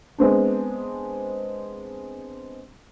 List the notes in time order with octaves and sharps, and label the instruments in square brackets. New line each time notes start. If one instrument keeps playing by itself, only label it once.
[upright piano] G#3 B3 C4 D4